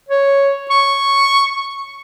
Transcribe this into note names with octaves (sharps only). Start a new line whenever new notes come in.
C#5
C#6